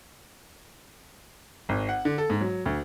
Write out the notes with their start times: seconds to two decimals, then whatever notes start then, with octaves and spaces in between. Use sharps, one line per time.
1.69 G#1
1.89 F#5
2.05 D3
2.18 A4
2.30 G#2
2.41 F#3
2.66 D2